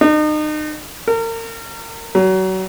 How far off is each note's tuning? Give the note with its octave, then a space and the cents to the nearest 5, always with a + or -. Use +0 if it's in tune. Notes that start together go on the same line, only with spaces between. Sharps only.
D#4 -35
A#4 -35
F#3 +30